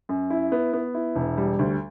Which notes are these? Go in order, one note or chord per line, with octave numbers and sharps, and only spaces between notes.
F#2
E4
B3
B3
E4
E1
G3
D2